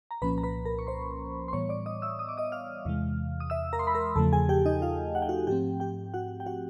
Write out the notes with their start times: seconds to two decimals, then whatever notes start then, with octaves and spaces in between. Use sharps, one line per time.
0.11 A#5
0.22 C2 A#2 F3 A#3 C#4 B4 B5
0.38 A#5
0.43 B4 B5
0.65 A#4 A#5
0.79 C#6
0.87 C5 C6
1.48 C6
1.53 A2 E3 G3 B3 C#5 C#6
1.69 D5 D6
1.86 D#5 D#6
2.02 E5 E6
2.19 D#6
2.29 D6
2.37 D#5 D#6
2.52 F5 F6
2.85 E2 C3 E3 G#3
3.40 D#6
3.50 E5 E6
3.73 A#4 A#5
3.79 C6
3.87 B5
3.94 A#4 A#5
4.16 E2 C#3 F3 A3 A4 A5
4.33 G#4 G#5
4.49 G4 G5
4.65 D#4 D#5
4.82 F4 F5
5.15 F#5
5.22 G5
5.29 F#4 F#5
5.47 G#2 F3 A3 C4 G4 G5
5.80 G4 G5
6.14 F#4 F#5
6.40 G5
6.46 F#4 F#5